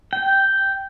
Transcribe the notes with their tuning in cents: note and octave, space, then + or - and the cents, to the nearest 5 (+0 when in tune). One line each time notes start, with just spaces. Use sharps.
G5 -5